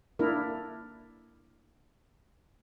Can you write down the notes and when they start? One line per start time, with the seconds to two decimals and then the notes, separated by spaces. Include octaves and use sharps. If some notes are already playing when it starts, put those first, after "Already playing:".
0.19 A#3 D4 E4 A#4